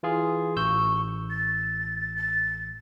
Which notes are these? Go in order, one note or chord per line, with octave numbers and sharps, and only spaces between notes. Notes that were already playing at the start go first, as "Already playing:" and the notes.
E3 F4 G#4
A1 C#6 E6 G6
A6
A6